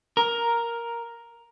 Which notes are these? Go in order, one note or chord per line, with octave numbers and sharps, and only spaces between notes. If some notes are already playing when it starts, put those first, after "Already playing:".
A#4